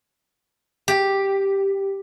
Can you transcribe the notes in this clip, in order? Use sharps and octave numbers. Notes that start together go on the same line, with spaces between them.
G4